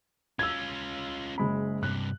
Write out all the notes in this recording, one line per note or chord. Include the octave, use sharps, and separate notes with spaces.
C#4 F4 E6 G#6
F#1 G#3 B5
G2 C3 F#6